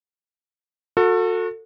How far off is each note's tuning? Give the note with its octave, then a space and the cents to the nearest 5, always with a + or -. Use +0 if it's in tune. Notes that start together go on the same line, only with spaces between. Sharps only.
F#4 -30 A4 +25